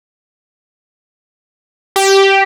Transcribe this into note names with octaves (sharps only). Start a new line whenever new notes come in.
G4